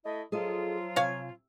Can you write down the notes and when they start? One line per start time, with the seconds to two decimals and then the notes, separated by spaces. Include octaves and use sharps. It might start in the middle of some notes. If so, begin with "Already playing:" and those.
0.04 A3 E4 D#5
0.32 F3 F#3 F4 G#4 A4 D#5
0.96 C3 C#5 F5 G#5